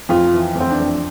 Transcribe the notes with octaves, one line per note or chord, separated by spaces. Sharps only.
F2 F4
E3
F2
C4
D4
F2